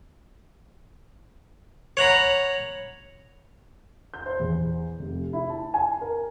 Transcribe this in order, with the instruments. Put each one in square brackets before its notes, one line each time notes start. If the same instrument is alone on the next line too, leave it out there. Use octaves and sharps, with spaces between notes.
[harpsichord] C#5 F#5 A#5 B5
[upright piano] G6
C5
E2
F1
E4
A5
G#5
A#4